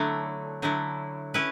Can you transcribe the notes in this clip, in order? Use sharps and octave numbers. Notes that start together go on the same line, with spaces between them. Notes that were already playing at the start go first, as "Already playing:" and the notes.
Already playing: D3 F#3 A3 E4
D3 F#3 A3 E4
C#4 E4 B4